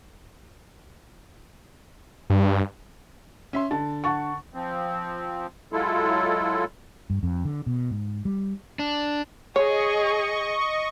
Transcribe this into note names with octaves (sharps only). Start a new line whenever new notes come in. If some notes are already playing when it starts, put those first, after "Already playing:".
G2
C#4 E5 C6
D3 A5
F#5 A5 C#6
F3 C4
F#3 G#3 E4 F4 A4
G2
F2
D3
B2
G#2
G3
D4
G#4 C#5 D#5 C#6